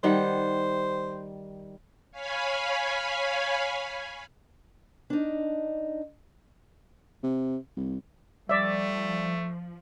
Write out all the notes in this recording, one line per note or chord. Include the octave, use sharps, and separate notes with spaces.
D#3 G3 C5 F#5
C#5 F5 G#5 B5
D4 D#4
C3
C2
F3 G3 A3 D5 E5